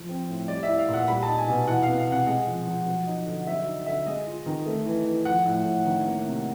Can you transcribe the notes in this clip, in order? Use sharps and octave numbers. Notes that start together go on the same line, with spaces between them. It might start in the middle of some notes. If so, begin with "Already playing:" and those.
Already playing: F3
C4
A2
G3 D5
E4 E5
F5
A#2
F#5
G3 B5
D#4 A5
G#5
B2
E3 F#5
B3 F5
F5
C3 F#5
G#3 F#5
F3
F3
F#3
D#4
D3
F#3 E5
D#4
D3 E5
G#3 D#5
F4
D#3
A3
E3
E3
F3 F#5
A2
A2
D#3
A#3
C3